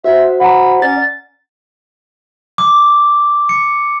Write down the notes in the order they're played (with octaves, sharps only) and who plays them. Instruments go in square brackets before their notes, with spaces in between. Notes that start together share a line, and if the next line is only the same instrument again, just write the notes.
[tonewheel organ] F#4 C5 [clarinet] E5
[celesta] F#5 A#5 [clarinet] B5
[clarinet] C#4 [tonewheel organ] D5 [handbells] A6
[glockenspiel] D6
C#7